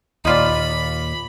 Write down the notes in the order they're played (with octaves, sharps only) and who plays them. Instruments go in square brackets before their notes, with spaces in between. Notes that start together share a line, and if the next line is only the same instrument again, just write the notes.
[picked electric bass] D#2 A#2 [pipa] D#4 F4 D5 [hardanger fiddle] B5